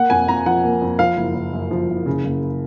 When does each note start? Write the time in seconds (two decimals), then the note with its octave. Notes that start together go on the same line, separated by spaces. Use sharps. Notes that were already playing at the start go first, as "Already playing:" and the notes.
Already playing: A#3 F#5
0.10 F2 G#5
0.28 F2 A#5
0.46 F3 F#5
0.64 A#3
0.82 F2
0.99 F3 F5
1.17 F#1
1.35 F#1
1.53 F#2
1.71 F3
1.89 F#1
2.06 C#3
2.24 F#1